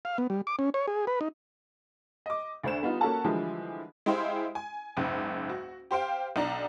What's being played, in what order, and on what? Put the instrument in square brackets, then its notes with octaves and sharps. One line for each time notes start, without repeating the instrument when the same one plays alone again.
[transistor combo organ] F5
B3
G3
D6
C#4
C#5
G#4
B4
D#4
[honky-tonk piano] D#5 D6
D2 D4 C5 E7
G3 B3 D#4 F4
A#3 C#4 F#4 A4 F#5 A5
D3 E3 F3 G3 G#3 E4
G#3 E4 G4 C5 F5
G#5
F#1 C#2 G#2
F#4
G4 C5 F5 G5
B1 D4 A#5